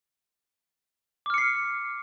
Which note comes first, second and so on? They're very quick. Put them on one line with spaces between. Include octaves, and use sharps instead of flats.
D6 F6 C#7 C7